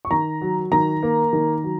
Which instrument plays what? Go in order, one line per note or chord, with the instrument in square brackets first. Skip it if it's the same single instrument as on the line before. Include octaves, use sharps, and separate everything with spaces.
[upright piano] C#6
D#3 A#5
F#3
D#3 A#5
A#3
D#3
F#3